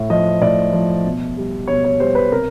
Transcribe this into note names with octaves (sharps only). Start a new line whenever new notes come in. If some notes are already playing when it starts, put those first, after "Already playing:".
Already playing: A2
F3 D#5
A2 D5
F3
B2
G3
B2 C#5
C#5
G3 C5
B4
C3 A#4